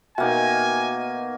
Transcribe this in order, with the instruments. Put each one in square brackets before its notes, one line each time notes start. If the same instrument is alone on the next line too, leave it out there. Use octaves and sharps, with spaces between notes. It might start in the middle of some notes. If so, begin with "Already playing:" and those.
[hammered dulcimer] B2 A#3 D#4 [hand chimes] F#4 E5 G5 [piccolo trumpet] G#5